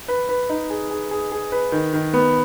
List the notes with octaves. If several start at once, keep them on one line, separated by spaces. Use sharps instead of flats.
B4
B4
D#4
G#4
G#4
G#4
G#4
B4
D#3
D#3
B3